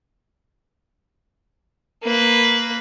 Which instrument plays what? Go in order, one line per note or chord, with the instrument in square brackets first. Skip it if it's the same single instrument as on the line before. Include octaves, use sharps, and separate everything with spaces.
[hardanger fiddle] A#3 B4